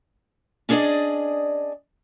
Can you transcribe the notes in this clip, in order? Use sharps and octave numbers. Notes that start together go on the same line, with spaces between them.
C#4 D4 G#4 B4 D5 D#5